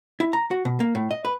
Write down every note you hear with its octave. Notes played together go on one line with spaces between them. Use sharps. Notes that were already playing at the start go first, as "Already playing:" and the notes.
E4
A#5
F#4
B2
A#3
A2
D#5
B4